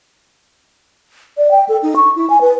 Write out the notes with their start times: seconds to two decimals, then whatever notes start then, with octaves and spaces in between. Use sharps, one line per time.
1.38 D5
1.51 G5
1.69 A4
1.83 D#4
1.96 C#6
2.16 E4
2.30 G#5
2.41 B4